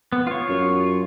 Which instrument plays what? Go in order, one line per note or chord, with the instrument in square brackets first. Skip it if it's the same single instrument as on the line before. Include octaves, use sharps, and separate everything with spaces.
[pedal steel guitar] B3
F4 C#5
[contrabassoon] F#2